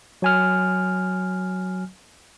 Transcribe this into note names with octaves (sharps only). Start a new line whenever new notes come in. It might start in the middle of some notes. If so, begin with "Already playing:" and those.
F#3 G#5 F6